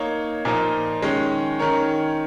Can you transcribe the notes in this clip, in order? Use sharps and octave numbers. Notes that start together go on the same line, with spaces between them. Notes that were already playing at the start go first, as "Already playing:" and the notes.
Already playing: A#3 D#4 C#5
A#2 F3 A#3 D#4
D#3 G#3 C#4
D#3 C#4 A#4 C#5